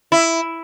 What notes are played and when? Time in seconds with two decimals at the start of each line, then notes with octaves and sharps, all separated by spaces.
0.12 E4